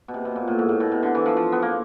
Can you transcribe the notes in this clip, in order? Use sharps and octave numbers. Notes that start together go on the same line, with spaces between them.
B2
C3
B2
A#2
A2
G#2
A2
B2
C3
D3
E3
F3
F3
B3
A#3